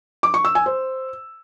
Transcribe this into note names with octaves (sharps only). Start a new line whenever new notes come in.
D6
C#6
E6
G#5
C5